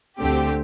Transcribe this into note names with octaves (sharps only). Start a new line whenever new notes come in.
D2 D3 A3 C4 G4